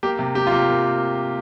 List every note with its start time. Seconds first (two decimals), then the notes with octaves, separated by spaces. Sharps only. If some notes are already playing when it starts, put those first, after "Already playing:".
0.03 A#3 G4
0.19 C3
0.35 A#3 G4
0.47 F4
0.52 C3 G4
0.69 A#3